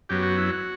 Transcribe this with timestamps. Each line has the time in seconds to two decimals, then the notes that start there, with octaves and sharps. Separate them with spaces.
0.09 F#2 F#3 B3 G4
0.23 F#4
0.37 E4
0.50 F#4